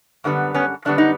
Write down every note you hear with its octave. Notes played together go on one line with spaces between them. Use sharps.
F#2 D3 G3 B3
B3 C#4
F#2 D3 G3 B3 D4
D#4